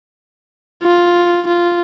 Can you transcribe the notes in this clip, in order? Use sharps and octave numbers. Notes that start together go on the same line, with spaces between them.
F4
F4